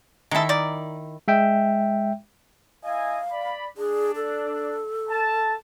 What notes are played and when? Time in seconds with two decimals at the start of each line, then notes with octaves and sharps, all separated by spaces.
0.31 D#3 G#3 E4 A4
0.49 D#4 A#4 D5
1.28 G#3 E5 G5
2.84 E4 D#5 F5 G#5
3.31 D5 B5
3.77 D4 G#4
4.16 A4
5.09 A5